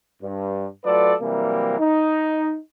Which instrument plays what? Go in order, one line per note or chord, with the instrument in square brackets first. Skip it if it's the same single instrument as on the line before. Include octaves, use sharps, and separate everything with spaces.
[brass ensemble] G2
F#3 A3 F4 A4 B4 D5
C3 E3 F#3 G3 A#3
D#4